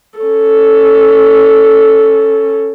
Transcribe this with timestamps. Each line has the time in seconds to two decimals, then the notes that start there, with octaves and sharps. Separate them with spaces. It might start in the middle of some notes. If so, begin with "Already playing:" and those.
0.19 C#4 A4